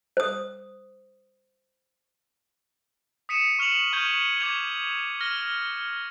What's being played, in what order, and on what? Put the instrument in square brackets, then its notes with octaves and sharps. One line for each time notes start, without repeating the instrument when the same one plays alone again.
[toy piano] C5 D#6
[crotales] D#6 B6 C#7 D#7 E7
C#6 F6 C#7 F7 F#7
C#6 F6 G6 G#6 D#7
D6 G#6 F7
F6 A#6